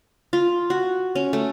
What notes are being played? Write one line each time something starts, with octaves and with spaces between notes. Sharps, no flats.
F4
F#4
C#4
A3